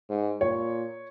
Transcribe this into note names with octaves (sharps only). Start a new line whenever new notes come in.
G#2
A#2 C#5